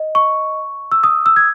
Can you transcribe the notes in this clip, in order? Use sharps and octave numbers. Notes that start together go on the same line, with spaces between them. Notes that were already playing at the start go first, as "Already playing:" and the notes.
Already playing: D#5
C#6
E6
D#6
E6
G#6